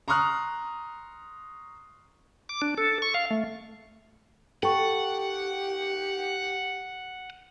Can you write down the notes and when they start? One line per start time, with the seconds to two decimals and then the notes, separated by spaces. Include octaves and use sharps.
0.08 A#5 C6 C#6 D#6 F6 F#6
2.49 D6
2.62 D4
2.78 A4
3.02 C#6
3.14 F5
3.31 A3
4.63 G4 A4 F#5 G5 C#6